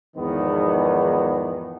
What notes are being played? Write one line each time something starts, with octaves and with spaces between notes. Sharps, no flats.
E2 G#2 D#3 F3 B3